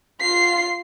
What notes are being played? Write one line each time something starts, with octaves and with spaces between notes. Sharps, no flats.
F4 C7